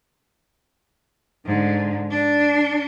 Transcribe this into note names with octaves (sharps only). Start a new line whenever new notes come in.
G#2 D3
D4